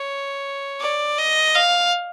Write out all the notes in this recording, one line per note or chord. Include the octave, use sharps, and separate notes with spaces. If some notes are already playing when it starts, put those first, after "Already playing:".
Already playing: C#5
D5
D#5
F5